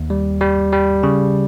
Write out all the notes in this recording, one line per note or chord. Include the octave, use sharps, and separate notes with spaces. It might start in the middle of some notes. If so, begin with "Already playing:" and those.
Already playing: D#2
G3
G3
G3
C#3